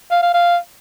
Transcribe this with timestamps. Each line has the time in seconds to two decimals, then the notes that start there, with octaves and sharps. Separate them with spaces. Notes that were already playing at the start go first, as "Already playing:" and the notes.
0.11 F5
0.23 F5
0.34 F5